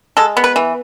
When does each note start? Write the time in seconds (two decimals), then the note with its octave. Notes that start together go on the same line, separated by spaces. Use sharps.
0.17 G#3 A4
0.37 B3
0.44 B4
0.56 E3